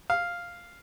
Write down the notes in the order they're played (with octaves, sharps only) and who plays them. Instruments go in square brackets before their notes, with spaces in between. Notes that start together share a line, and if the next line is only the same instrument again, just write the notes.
[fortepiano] F5